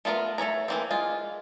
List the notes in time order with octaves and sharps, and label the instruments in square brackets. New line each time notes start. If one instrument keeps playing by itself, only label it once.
[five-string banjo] A3 B3 F4 F#4 A#4
A3 A4 C#5 A#5
E3 A#3 C4
G#3 F4